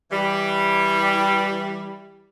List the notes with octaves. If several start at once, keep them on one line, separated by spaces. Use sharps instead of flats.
E3 G3